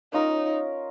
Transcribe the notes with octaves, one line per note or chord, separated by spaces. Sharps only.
C#4 D#4 F4 A#4 D#5